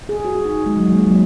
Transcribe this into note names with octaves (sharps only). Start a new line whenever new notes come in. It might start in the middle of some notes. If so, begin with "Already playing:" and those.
G#4
F#4
F#4
D#4
G#3
F#3
F#3
A#3
G#3
F#3